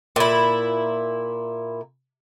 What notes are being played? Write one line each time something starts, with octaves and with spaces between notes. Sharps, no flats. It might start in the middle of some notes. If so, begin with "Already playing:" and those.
A#2 E4